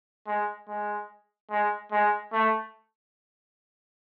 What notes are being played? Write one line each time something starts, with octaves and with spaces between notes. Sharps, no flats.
G#3
G#3
G#3
G#3
A3